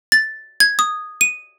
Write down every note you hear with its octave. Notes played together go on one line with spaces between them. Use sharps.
A6
G#6
D#6
D#7